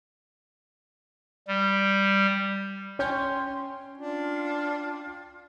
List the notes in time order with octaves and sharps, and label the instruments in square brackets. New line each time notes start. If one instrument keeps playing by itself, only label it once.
[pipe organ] G3
[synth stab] C#4 [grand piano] G5 G6 [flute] C6
[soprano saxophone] D4 [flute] F4